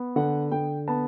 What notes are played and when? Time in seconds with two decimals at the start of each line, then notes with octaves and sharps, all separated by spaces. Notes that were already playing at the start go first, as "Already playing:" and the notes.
Already playing: B3
0.16 D3 F#5
0.52 D3 G5
0.88 B3 A5